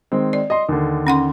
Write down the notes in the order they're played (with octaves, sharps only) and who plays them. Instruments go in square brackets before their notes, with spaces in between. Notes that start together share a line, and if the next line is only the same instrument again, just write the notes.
[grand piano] D#3 G#3 C4
[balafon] D5
[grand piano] D#5 C6
D#2 D3
[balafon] C#4 F#5 C6